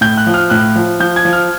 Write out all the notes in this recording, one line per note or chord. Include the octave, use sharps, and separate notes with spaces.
A2 G6
F#6
F3
F6
A2 F#6
F3
F3 G6
G#6
F3
F6